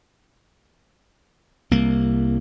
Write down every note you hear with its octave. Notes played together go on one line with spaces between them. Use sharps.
C2 A#3